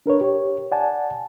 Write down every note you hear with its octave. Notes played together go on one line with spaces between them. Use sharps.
D4 A#4 B4 C#5
G4 C#5
D5 F#5 G#5 A5